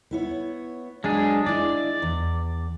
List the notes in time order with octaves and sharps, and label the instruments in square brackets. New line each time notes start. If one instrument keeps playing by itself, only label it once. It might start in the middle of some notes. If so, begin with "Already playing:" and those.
[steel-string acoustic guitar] B3 E4 C#5
[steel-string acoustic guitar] F#3 [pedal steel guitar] G#3 D4 G#4
[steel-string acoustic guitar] D4 E4 D#5 [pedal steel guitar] D5
[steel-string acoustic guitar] E2